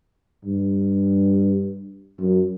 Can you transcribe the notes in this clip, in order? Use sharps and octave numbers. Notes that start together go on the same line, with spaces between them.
G2
F#2